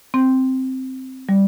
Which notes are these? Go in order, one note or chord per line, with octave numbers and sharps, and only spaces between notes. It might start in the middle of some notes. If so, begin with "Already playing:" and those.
C4
G3